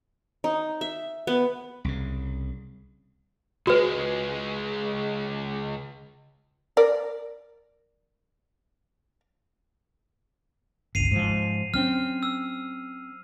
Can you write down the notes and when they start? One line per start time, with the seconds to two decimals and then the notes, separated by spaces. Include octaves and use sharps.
0.44 D#4
0.81 E5
1.27 B3
1.85 C2 C#3
3.67 C#2 G#3 F#4 B4
6.77 A#4 D5
10.95 G1 C#2 C7 D#7 F7
11.11 G#2 F3
11.74 F#3 C4 C#4 F6
12.23 E6